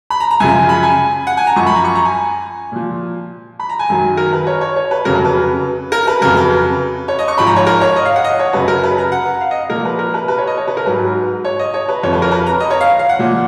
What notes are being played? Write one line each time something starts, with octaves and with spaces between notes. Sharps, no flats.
B5
A#5
A#5
F#2 C#3 F3 G#5
B5
G#5
F#5
G#5
A#5
F#2 F3 C#6
B5
A#5
C#6
A#5
G#5
A#2 F3
B5
A#5
G#5
F#2 D#3 F#3
A#4
B4
C#5
C#5
C#5
B4
F2 C#3 F#3 A#4
B4
B4
A#4
B4
F2 C#3 F#3 A#4
B4
C#5
D#5
C#6
G#2 F3 B5
A#5
C#5
A#4
C#5
D#5
F5
F#5
D#5
C#5
F#2 C#3 F#3 B4
A#4
B4
A#5
F#5
F5
D#5
A#2 F3 A#4
B4
A#4
B4
B4
C#5
D#5
C#5
B4
A#4
G#2 F#3 B4
C#5
D#5
C#5
B4
F2 F3 C#5
B4
A#4
B4
A#5
D#5
C#5
F5
F5
F#5
A#2 F3